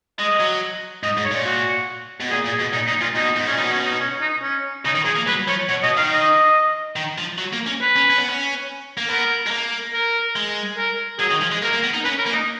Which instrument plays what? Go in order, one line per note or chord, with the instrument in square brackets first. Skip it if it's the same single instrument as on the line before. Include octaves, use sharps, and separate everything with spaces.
[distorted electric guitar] G#3 [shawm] D#5
[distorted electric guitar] F#3
[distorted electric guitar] G#2 [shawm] D#5
[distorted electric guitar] G#2
[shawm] C#5
[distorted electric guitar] A#2
[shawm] F#4
[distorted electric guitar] B2
[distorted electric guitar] A#2 [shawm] G#4
[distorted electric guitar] A#2
[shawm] G#4
[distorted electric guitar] B2
[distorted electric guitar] A#2 [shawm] D#4
[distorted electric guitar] G#2 [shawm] D#4
[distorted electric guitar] A#2 [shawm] F4
[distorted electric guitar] B2 [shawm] D#4
[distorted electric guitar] G#2
[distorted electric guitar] A#2 [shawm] C#4
[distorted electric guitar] B2 [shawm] D#4
[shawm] C#4
D#4
C#4
D#4
C#4
[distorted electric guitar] C#3 [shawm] D#4
[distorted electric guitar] D#3
[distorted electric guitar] F3 [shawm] G#4
[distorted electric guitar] A#3
[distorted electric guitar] F#3 [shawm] B4
[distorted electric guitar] F3 [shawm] C#5
[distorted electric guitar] B2 [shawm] C#5
[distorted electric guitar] B2 [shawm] D#5
[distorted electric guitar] D#3 [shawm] F5
[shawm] D#5
[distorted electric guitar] D#3
F3
F#3
A#3
C#4
[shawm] B4
[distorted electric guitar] C#4
C#4
B3
C#4
A#3
[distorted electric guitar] B3 [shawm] A#4
[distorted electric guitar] G#3
A#3
[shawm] A#4
[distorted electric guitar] G#3
[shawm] A#4
[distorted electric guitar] F#3 [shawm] G#4
[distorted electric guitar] D#3
F3
G#3
[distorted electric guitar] A#3 [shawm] A#4
[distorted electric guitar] A#3
B3
D#4
[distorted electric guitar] C#4 [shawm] B4
[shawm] A#4
[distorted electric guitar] A#3
[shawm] D#4